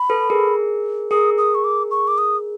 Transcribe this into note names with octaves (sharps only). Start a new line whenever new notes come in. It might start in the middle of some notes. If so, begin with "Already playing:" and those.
Already playing: B5
A4 B4
G#4 A#4
G#4 A#4 D#6
D#6
C#6
D6
C#6
D6
D#6